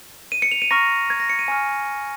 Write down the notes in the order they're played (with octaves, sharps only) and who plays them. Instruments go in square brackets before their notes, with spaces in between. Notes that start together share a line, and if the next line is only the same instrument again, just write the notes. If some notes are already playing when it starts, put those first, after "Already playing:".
[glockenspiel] D#7
C#7
F7
D#7
A#5 C#6 F6 A#6
G#6
A#6
C#7
D#7
G#5 C#6 F6